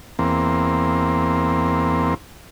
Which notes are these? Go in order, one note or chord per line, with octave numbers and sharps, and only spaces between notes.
E2 A#3 C4